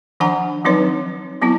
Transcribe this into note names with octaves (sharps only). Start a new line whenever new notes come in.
D#3 F3 D4 F#5 G#5 A#5
F3 F#3 C4 D#4 B4 C#5
F#3 B3 C4 E4